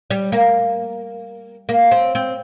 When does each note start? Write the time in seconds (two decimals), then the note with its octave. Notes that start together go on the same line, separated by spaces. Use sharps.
0.10 G3
0.32 A#3
1.69 A#3
1.91 C4
2.15 C4